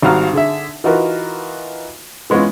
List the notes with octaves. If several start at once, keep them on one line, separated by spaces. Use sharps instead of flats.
G#1 G3 F#4 F5 A#5 F6
D3 G#4 E5
E3 D#4 F4 F#4 A#4 B4
E3 G#3 B3 C#4 F4